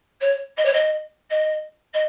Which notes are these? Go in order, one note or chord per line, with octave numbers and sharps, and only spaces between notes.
C#5
D#5
C#5
D#5
D#5
D#5